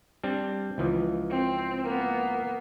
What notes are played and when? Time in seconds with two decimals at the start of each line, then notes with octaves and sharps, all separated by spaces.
0.24 G3 C4 D4
0.78 C#2 E3 F3
1.31 C4
1.84 A#3 B3